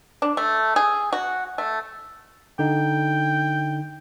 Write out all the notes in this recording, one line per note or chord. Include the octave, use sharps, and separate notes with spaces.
D4
A3
G#4
F#4
A3
D3 D#4 G5